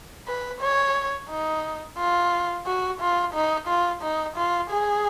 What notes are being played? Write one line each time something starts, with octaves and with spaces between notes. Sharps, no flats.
B4
C#5
D#4
F4
F#4
F4
D#4
F4
D#4
F4
G#4